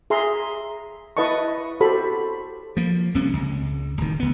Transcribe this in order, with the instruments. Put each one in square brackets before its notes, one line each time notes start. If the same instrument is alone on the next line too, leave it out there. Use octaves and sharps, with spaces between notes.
[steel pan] G#4 E5 A#5 C6
E4 B4 D#5 A5 C#6
F#4 G4 A4 C5 B5
[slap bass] F3 A#3
C2 C3 A#3 C#4
C#2
D1 D#3
C#2 B3